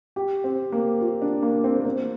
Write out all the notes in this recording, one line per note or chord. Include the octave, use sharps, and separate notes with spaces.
G4
C4
A#3
F4
D4
A#3
C4
A#3
C4